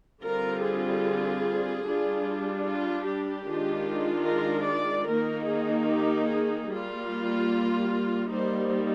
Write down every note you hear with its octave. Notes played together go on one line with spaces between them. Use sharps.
D3 G3 C4 F4 A#4
G#4
G3 D4 F4
F4
G4
D#3 G#3 D4 F4
A#4
D5
D#3 A#3 D#4 A#4
G#4
G4
G#4
G3 A#3 F4
G3 A#3 D#4 C5